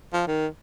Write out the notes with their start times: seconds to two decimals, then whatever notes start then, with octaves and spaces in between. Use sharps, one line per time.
0.13 F3
0.27 D#3